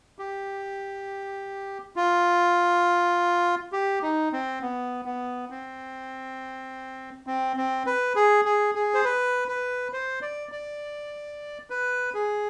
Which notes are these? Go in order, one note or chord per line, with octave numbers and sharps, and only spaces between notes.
G4
F4
G4
D#4
C4
B3
B3
C4
C4
C4
B4
G#4
G#4
G#4
C5
B4
B4
C5
D5
D5
B4
G#4